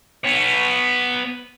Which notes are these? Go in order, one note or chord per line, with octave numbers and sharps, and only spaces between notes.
B3 C#5